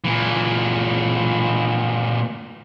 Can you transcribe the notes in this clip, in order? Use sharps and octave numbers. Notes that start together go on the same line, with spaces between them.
A#2 E3